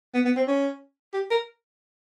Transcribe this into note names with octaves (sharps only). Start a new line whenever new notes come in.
B3
B3
C4
C#4
G4
A#4